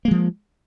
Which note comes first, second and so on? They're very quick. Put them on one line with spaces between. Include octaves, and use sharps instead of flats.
A#3 G#3 F3